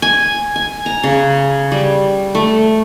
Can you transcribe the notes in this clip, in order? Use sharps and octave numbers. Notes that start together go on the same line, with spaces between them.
G#5
G#5
A#5
C#3
G3
A3